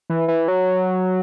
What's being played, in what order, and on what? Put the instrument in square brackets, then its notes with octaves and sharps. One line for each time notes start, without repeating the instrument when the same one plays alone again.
[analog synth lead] E3
E3
F#3